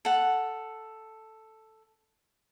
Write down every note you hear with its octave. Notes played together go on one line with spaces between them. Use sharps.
A4 F#5